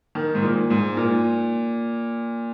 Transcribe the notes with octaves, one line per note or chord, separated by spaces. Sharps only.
D#3
G#2
A#2
G#2
A#2